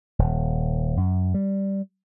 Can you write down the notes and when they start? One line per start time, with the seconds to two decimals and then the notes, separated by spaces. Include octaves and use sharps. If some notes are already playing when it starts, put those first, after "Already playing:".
0.19 D#1
0.97 F#2
1.34 G3